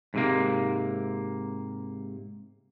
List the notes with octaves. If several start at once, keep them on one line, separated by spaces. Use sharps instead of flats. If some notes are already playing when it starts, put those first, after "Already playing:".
G#2 C3 A#3